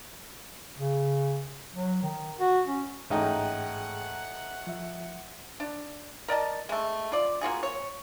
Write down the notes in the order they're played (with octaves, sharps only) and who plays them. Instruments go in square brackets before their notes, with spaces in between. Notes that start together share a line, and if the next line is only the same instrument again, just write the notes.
[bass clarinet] C#3
F#3
D#3
F#4
C#4
[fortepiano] A1 D#4 [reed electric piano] G#2 G#4 G5 [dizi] F#5
[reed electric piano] F3 E5
[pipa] D4
A#4 D5 D#5 A5
G#3 A3
F4 D5
A#3 F4 F#4 G#4
C#5